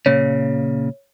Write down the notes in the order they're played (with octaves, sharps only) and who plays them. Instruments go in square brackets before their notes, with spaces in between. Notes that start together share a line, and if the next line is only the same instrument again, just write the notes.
[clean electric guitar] A#2 C#3 [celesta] C#5